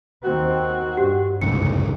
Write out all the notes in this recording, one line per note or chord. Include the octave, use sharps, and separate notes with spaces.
D#2 D#3 C4 F#4
G2 G4
F#1 C2 F2 G#2 C#3 C#7